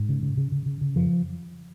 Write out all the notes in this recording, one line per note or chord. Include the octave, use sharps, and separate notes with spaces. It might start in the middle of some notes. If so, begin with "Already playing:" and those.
Already playing: G#2
C#3
C#3
C#3
C#3
C#3
C#3
F2 F3